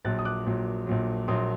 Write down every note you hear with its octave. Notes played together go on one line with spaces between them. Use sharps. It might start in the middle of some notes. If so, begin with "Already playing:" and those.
A#1 A#2 F#3 F#6 A6
D#6
D6 F#6
A#1 A#2 F#3
A#1 A#2 F#3
A#1 A#2 F#3 C6 D#6